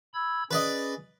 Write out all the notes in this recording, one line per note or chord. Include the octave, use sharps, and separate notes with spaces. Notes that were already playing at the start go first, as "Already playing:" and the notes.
B5 E6 G#6
C#4 G#4 B4 D5 D#5